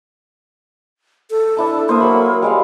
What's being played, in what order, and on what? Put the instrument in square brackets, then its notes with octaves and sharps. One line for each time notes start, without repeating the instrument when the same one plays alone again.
[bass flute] A4
[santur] D4 E4 A5
[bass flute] A#3 [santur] C5 E5 D#6
[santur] F#3 B5
G3 G#3 F5